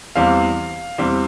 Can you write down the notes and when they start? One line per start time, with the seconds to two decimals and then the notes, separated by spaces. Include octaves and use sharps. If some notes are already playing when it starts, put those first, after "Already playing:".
0.15 E2 E3 G3 C4 F5
0.98 E2 E3 G3 C4